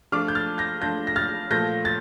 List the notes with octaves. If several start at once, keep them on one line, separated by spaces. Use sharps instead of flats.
F3 A3 D4 F4 D6 F6
G6
F6 A6
G6 A#6
F3 A3 D4 F4 G6 A#6
A#6
F6 A6
A#2 F3 A3 G6 A#6
A6